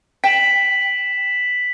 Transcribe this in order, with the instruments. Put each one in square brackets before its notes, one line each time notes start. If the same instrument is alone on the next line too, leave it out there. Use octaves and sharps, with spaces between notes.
[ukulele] G5 [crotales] B6 E7 F#7